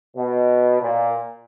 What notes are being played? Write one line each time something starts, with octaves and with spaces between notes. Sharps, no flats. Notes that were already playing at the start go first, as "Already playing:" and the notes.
B2
A#2